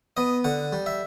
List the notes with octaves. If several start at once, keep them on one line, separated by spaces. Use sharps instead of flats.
B3 D#5
D3 F#5
G3
E5